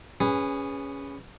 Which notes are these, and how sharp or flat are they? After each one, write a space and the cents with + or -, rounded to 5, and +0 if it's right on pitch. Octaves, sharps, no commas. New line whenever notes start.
C#4 +5 G#4 -20 B4 +0